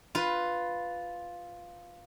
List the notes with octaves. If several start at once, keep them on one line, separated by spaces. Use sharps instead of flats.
F4 B4